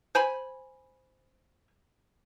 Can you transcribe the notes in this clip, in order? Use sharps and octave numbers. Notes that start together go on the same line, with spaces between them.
C5 G#5 B5